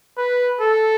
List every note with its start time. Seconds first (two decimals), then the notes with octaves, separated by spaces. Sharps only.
0.17 B4
0.60 A4